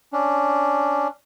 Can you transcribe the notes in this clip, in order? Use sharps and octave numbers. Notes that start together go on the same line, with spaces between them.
C#4 D4